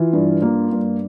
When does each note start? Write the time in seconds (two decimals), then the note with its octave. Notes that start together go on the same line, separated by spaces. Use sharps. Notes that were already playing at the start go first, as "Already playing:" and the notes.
Already playing: E3 F4
0.13 G2
0.42 A#3
0.72 G2